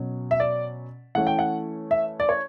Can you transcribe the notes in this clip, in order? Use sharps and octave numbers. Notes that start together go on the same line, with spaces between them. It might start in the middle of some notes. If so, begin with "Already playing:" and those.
Already playing: B2 F#3 C#4
E5
D5
E3 A3 C#4 F#5
G5
F#5
E5
D5
C#5